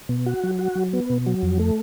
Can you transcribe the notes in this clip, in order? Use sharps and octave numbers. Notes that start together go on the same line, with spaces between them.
B2
F#4
F#3
F#4
F#3
B3
B2
F#3
F2
A3